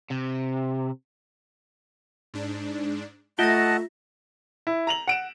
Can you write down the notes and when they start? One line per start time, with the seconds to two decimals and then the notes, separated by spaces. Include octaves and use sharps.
0.10 C3
2.34 G#2 D4
3.39 A3 F4 D#5 E5 F#5 A5 A#6
4.67 E4
4.87 A#5 F7 F#7
5.07 F#5 D7 E7